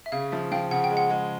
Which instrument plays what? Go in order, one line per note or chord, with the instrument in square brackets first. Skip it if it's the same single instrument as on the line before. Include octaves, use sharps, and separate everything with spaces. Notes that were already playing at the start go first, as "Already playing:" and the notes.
[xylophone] E5
[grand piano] C#3 [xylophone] F5
[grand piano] F3 [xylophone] E5
[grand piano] F3 [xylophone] F5 G5
[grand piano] C#3 [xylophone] F#5
[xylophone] G5
[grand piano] G#3
[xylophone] F#5
[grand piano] G#3